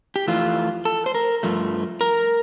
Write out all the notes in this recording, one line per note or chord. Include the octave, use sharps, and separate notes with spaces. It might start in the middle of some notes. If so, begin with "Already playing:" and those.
G4
F2 E3 A3 F4
A4
C5
A#4
G2 F3 A3
A#4